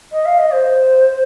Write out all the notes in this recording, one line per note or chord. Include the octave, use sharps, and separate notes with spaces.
D#5
F5
D#5
C5